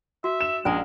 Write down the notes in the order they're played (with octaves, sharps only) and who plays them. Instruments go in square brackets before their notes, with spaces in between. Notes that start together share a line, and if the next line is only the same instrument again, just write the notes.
[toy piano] F#4 [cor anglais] E5
[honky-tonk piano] E7
[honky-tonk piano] A#1 [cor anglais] G#3 [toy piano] C#4 G#5 A#5